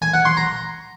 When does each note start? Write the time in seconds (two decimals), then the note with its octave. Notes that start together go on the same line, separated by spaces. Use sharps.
0.02 G#5
0.14 F#5
0.25 C6
0.37 A#5